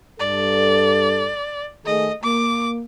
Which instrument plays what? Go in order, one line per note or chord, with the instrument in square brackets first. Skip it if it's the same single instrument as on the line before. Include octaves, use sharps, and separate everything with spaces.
[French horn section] G2 A4 [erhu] D5
[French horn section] D#3 A3 G#4 [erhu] D#5
[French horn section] A#3 [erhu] D6